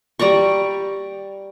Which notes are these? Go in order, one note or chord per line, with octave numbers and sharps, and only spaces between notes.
G3 D5 A#5 C#6